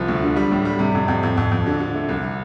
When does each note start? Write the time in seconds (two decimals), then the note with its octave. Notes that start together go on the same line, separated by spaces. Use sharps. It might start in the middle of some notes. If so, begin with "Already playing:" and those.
Already playing: C2 F3
0.08 D2
0.23 D3
0.36 G3
0.52 A2
0.65 G3
0.79 C3
0.94 F2
1.08 F2
1.23 F2
1.37 F2
1.51 F2
1.66 D3
1.80 D3
1.95 A3
2.09 C2